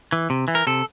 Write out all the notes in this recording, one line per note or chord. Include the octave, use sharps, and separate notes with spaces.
E3
C3
E3
A#4
C3 A4